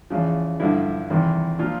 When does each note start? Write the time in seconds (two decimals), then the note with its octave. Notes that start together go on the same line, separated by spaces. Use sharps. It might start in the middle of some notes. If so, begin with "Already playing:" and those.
0.10 E2 C#3 F3
0.60 G2 D3 F3 E4
1.10 E2 C3 D#3
1.59 A#2 F3 F4